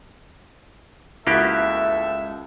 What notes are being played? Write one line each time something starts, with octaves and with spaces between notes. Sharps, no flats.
C#2 A#3 B3 E4 F#4 G4 A4 E5